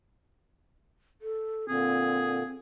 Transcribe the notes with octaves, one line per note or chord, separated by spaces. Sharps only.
A4
A#2 D3 C4 G#4